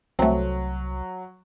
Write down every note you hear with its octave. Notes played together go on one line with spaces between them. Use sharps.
C2 F#3 A3 C4